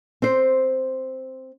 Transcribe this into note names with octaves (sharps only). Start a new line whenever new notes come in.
C4 C5